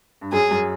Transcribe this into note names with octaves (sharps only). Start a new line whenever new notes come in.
G2
F#2 G#4
F#2